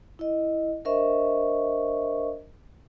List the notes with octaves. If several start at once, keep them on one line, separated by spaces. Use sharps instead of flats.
E4 D#5
D4 A#4 C5 D#5 E5 C#6